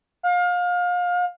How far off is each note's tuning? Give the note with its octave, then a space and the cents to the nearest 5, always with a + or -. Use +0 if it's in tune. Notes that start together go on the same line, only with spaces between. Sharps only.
F5 +30